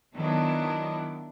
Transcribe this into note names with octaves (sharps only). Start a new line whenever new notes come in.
D#3 F#3 B3 D4 E4